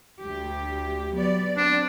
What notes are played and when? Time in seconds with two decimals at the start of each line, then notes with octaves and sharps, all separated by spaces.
0.20 D2 G4
1.14 F#3 B3 D5
1.57 C4 D4